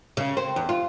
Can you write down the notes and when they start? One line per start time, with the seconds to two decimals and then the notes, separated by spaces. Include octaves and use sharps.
0.17 C#3
0.37 C4
0.56 E2
0.69 F4